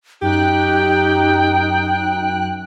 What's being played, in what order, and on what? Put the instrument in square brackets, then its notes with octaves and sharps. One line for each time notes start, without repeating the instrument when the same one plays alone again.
[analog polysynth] F#2 F#6 [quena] D#4 [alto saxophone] G4 [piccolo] G5